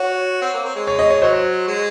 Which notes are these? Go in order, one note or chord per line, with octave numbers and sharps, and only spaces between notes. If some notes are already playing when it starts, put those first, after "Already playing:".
Already playing: F#4 C#5
C4
A#3
C4
G#3
C#5
D#5
C#5
F#3 C5
G#3